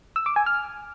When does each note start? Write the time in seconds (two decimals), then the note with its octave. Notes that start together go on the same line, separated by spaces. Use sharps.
0.16 E6
0.26 D6
0.36 G#5
0.46 F6